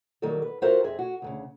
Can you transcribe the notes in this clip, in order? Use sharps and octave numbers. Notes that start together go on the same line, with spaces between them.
D#3 F#3 G3 A#3 A4
B4
F4 F#4 A4 A#4 C5 E5
F2 C4 G#4 E5
F#4
D2 A2 C#3